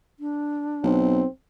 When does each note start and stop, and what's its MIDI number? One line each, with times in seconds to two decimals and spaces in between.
0.20 0.97 62
0.84 1.24 35
0.84 1.27 60